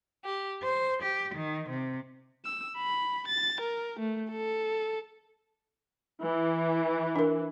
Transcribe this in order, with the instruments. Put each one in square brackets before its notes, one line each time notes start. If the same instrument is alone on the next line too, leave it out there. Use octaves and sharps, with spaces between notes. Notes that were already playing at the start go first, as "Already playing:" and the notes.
[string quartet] G4
C5
G4
D#3
C3
[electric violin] E6
B5
A6
A#4
A3
A4
[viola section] E3
[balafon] D4 A#4